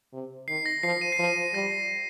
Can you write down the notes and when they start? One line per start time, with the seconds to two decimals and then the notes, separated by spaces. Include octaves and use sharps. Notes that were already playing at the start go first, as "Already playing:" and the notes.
0.13 C3
0.48 D#3 C7
0.66 A#6
0.83 F3 C7
1.01 D#7
1.12 C7
1.19 F3 D#7
1.54 G3 A#6